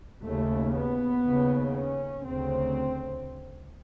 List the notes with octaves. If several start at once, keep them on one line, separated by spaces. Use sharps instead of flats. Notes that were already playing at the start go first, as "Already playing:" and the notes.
D#2 C#3 A3
B3
D#2 C#3
C#4
D2 C#3 C4